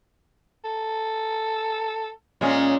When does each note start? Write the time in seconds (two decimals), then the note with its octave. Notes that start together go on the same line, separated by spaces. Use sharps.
0.64 A4
2.41 A#2 G#3 C#4 C#5